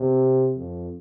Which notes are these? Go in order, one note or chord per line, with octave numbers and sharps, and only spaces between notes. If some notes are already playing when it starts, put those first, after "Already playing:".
Already playing: C3
F2